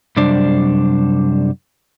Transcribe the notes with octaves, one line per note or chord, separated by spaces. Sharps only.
F#2 C3 G3 D4 C5